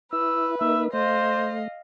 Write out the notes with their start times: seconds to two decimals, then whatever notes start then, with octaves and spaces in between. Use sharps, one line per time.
0.13 E4 B4 E6
0.61 A#3 D#4 E5
0.93 A3 C5 D#5 F5